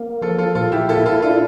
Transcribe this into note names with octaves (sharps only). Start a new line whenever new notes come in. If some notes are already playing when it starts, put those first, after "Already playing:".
Already playing: A#3
F3 F4 A4
F4 A4
A#2 F4 A4
E4 G4
E4 F4 A4
F4 A4
D4 F4 A4